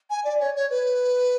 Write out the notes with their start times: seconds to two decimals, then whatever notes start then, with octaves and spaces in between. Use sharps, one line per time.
0.10 G#5
0.24 D5
0.40 C#5
0.56 C#5
0.70 B4